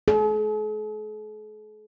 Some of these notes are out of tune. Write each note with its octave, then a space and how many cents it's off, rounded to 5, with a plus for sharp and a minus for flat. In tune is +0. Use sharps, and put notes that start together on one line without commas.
G#4 +45